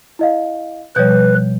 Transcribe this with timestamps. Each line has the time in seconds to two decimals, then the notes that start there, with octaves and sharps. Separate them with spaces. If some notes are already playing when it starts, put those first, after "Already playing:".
0.19 E4 D#5 F5
0.96 B2 F3 G3 B4 C#5 G6